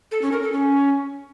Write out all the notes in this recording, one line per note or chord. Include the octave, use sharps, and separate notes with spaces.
A4
C#4
A#4
A4
C#4